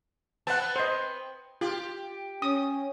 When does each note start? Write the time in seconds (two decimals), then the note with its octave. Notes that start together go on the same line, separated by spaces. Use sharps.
0.47 B3 C4 F#5 A5
0.76 C5 D#5
1.61 F4 G4
2.42 C#4 D#6